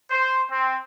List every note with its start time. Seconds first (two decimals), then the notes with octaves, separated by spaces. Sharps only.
0.10 C5
0.51 C4